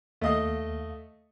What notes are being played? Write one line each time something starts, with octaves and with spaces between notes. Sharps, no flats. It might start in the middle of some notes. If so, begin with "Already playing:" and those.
D#2 A3 D#5 F5 D#6